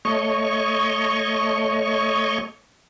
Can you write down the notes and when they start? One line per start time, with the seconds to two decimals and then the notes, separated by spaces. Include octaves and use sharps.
0.05 A3 C#5 D#5 C#6